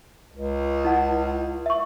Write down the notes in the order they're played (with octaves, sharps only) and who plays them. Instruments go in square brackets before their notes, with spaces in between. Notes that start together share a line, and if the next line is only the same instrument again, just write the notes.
[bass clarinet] C#2
[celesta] E4 F#5 G#6
E5 C#6